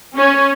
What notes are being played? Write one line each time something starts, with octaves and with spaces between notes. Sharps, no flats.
C#4